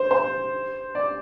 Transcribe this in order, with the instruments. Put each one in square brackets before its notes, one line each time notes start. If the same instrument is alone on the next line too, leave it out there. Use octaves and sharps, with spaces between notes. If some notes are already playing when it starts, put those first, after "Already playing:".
Already playing: [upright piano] C5
C5
D5